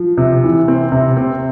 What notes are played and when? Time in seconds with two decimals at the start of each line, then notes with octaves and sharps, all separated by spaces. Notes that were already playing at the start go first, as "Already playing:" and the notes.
Already playing: F3
0.18 C3
0.43 E3
0.68 C4
0.92 C3
1.17 C4